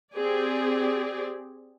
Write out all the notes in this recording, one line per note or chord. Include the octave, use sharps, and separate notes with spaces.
C4 G4 G#4 D5